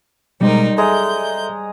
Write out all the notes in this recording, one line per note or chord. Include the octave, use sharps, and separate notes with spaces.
B2 G3 G#3 D#4 A#4 C5
G#3 G#4 A4 E5 A#5 G6